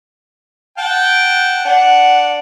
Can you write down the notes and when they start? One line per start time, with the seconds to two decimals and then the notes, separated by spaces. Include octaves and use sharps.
0.78 F#5 G5 A5
1.65 D4 F#5